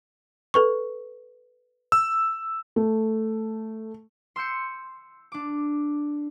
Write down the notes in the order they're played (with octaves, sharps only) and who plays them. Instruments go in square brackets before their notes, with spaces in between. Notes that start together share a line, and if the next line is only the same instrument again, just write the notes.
[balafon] A4 B4 C#6
[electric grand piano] E6
[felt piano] A3
[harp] C6 E6 G6 C#7
D4 D6